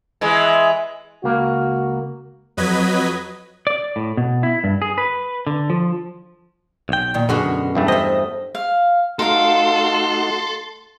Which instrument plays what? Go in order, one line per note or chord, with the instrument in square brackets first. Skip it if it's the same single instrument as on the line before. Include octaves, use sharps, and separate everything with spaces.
[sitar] E3 G#3
[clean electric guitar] C#2 A#3 [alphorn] F#4
[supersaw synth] F2 F#3 B4 D#5 G#6 B6
[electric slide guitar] D5
A2
B2
E4
G2
G#4
B4
D3
F3
[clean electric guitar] B1 G5
[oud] A#2 D#3
[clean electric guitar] F#2 B2 [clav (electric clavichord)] D3 [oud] C#4 F#4 G#4
[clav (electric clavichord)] E2 G2 A3
[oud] C5 E5 [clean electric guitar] D#5
[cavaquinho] F5
[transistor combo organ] A3 D#4 F#4 [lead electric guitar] A4 [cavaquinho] A#4 F5 [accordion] C6